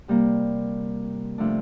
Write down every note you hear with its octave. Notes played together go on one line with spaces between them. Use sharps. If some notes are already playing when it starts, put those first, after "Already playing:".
C3 G3 A#3
C3 F3 A3 D4